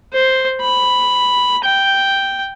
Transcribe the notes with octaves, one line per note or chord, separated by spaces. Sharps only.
C5
B5
G5